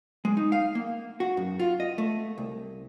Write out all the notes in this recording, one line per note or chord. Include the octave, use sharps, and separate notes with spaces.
G#3
D#4
F5
A#3
F#4
F#2
F4
D#5
A3
C2